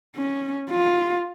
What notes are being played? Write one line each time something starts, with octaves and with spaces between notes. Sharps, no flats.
C#4
F4